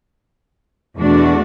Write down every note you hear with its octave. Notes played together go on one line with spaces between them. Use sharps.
E2 B2 A3 D4 F#4